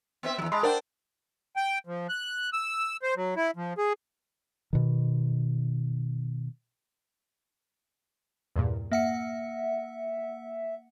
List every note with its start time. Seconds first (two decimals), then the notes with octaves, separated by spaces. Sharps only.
0.23 B3 C4 E5
0.38 E2 F#3
0.52 G#3 A5 B5 C6
0.63 D4 A#4 C5 D5 F#5 G5
1.56 G5
1.87 F3
2.09 F#6
2.53 E6
3.02 C5
3.16 F#3
3.36 E4
3.56 F3
3.78 G#4
4.73 B2 D#3
8.56 E2 G2 A#2
8.91 A#3 E5 F#5 C#7